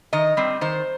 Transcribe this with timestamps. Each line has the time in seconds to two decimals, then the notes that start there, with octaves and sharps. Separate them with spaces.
0.13 D#3 D#5
0.37 G3 C4
0.61 D#3 C5